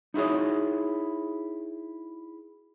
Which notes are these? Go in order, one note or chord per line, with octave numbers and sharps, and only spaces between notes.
D#4 E4 F#4 G#4 C#5